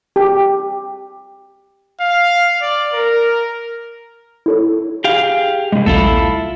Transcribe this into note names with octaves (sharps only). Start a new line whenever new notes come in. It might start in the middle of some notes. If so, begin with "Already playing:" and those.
G4
F5
D5
A#4
E4 A4 C#5
G4 G#4 F5
C2 G2 G#3 A#3
A#1 D#2 E4 F4 A4